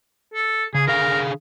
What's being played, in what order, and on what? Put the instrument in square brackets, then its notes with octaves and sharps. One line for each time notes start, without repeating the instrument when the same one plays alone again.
[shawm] A4
[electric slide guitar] C#3 [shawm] G#4
[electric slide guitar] D3 G#4 F5 [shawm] A#4